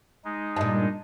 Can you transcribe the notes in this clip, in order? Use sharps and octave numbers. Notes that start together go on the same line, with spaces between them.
G#3 D#4
G2 A#2 D#5 A5